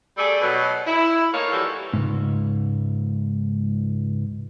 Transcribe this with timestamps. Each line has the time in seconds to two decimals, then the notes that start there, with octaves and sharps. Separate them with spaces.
0.18 G3 A3 G#4 A4 D5
0.41 B2 F#3
0.87 E4
1.34 A3 A#3 D#4 C#5 F5
1.52 E3 F3 G3 F#4 G4 A4
1.93 C#2 G#2